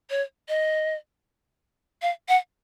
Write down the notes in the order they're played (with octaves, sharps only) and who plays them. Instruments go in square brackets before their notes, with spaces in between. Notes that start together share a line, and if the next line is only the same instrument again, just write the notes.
[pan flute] C#5
D#5
F5
F#5